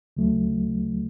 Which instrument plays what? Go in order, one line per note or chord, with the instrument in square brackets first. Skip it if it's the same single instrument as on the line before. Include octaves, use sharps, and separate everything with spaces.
[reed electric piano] D2 C#3 F#3 A3